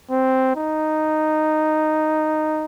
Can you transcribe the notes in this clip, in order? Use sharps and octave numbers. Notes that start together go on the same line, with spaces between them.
C4
D#4